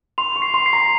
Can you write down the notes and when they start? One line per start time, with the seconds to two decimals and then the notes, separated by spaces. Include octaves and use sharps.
0.18 C6 F7
0.36 C#6
0.42 C7
0.54 C6
0.66 C7
0.73 A#5